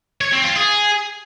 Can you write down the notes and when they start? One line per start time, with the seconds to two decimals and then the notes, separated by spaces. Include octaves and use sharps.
0.21 C#5
0.33 C4
0.44 F4
0.56 G#4